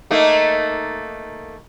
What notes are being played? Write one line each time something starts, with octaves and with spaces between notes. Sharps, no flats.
A3 A#3 D#4